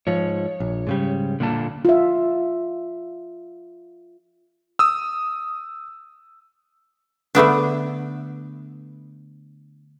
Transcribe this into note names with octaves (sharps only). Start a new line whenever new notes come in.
G#2 F3 C#5
A#1
G#2 C#3 G3
A#2 D3 A#3 A5
F4 E5
D#6 E6
D3 A3 B3 D4